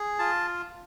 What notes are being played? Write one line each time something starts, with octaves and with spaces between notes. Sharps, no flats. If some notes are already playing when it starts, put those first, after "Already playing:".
Already playing: G#4
F4 A5